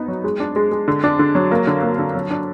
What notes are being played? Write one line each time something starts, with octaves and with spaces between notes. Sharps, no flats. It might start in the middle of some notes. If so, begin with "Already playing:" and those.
Already playing: B3 D#4
F#3
G#3
D4
G#3
G#3
D3
D4
D3
F#3
A#3
D3
A#3
D3
F#3
D4